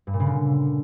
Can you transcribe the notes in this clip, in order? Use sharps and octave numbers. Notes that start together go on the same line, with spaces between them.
G2
A#2
C#3
D3